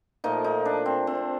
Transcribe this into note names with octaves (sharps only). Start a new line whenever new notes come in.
A#2 F3 A3 D#4
D#4
D4
C4
C4